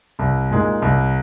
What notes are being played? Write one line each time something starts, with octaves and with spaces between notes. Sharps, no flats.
C2
A#2 G#3 D#4
C2